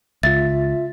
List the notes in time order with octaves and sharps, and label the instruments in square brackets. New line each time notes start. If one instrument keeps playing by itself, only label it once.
[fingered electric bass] C#2 [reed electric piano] F4 E5 [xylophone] A6